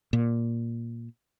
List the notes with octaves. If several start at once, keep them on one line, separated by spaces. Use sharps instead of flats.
A#2